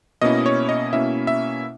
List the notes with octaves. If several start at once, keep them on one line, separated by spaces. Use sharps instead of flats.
B2 A#3 C#4 E4 D#5
C#5
D#5
B2 A#3 C#4 E4 E5
E5